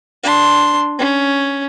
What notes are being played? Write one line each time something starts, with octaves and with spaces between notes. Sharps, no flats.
D4 C6
C#4